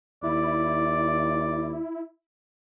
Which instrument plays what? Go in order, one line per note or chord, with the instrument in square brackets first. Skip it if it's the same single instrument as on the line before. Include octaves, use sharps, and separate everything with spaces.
[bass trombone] D#2 [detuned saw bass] E4 [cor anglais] D5